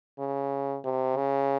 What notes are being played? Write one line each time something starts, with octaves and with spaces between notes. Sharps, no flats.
C#3
C3
C#3